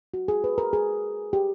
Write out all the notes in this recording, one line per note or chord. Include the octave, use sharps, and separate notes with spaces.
F#4
G#4
B4
A#4
G#4
G4